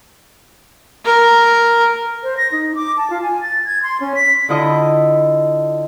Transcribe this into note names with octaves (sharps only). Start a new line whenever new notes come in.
A#4
C5
A#6
D#4
D6
A5
F4
G#5
A6
G#6
C6
C#4
B6
D3 E4 F4 D#5